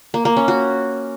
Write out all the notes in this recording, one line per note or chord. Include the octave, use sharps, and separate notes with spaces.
A#3
A#3
C#4
F#4